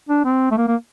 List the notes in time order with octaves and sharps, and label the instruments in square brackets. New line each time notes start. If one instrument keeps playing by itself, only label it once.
[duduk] D4
C4
A3
A#3
A#3